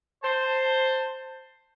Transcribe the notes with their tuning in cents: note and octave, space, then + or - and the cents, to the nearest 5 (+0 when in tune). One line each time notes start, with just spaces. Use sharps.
C5 +0 A5 +20